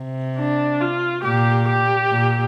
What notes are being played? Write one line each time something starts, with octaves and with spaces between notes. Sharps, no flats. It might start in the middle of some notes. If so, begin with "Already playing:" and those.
Already playing: C3
D4
F4
A#2 G4
G4
A#2